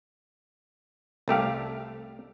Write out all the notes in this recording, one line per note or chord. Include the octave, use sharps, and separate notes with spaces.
C2 A3 G4 F5